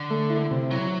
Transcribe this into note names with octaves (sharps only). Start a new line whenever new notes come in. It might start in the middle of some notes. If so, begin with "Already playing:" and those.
Already playing: D3
A3
E4
C3
F#3 E4